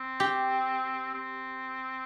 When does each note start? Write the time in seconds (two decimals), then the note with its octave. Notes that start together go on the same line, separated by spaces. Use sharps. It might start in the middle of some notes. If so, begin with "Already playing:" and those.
Already playing: C4
0.20 G4
1.14 C4